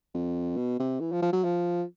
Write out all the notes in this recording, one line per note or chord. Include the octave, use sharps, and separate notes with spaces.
F2
B2
C3
E3
F3
F3
F#3
F3